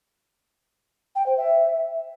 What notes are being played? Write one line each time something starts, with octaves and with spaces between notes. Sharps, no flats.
G5
C5
E5